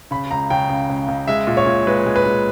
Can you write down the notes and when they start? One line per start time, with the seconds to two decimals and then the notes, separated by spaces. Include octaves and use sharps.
0.11 C#3 B5
0.31 C#2 A#5
0.50 C#3 G5
0.69 C#2
0.90 C#2
1.08 C#2
1.28 G#3 E5
1.47 A#2
1.57 C#5
1.66 A#2
1.87 G#3 B4
2.06 G#3
2.16 B4
2.26 G#3